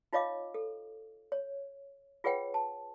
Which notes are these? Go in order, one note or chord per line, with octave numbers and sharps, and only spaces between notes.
D#4 F4 C#5 D#5 F5 D6
A4
C#5
F4 G#4 B4 C#5 F#5 G5
A5